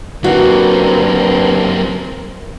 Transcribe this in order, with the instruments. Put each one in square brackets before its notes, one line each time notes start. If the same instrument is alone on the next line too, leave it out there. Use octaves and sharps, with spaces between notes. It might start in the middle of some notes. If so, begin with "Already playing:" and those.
[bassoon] G2 [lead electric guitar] F#3 A#3 [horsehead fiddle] C4 A#4 [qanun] F#4